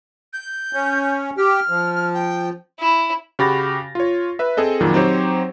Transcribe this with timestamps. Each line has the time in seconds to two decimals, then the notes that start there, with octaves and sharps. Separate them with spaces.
0.33 G6
0.73 C#4
1.37 G4 F6
1.70 F3
2.14 G5
2.80 E4
3.39 C#3 F#4 G4 B5 A6 A#6
3.95 F4 C#5
4.39 B4 E5
4.57 C4 G#4 A4 D#5
4.80 F2 A#2 D#3 F#3
4.93 F#3 C4 D#4 G4 C5 C#5